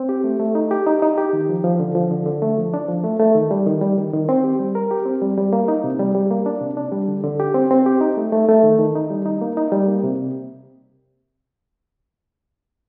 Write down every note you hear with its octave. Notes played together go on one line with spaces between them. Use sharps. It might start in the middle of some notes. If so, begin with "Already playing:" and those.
Already playing: C4
G4
A3
A3
D#4
G4
D#4
D#4
G4
D#3
F3
F3
D3
F3
D3
D3
A3
F3
D4
F3
A3
A3
D#3
G3
D#3
G3
D#3
D#3
C4
G4
G3
A#4
G4
C4
G3
G3
A#3
D#4
C3
G3
G3
A#3
D4
C3
D4
G3
D3
D3
G4
C4
C4
G4
D#4
A3
A3
A3
D#3
D#3
D#4
G3
D#4
A#3
D#4
G3
A#3
C3